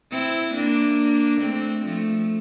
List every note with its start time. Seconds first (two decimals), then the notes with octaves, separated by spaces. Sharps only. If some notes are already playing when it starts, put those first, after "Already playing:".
0.12 C4 E4
0.54 A#3 D4
1.41 A3 C4
1.85 F3 A3